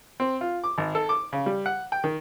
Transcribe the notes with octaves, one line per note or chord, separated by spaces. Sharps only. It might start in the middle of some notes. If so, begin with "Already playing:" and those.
C4
F4
D6
G#1
A4
D6
C#3
G3
F#5
G5
D#3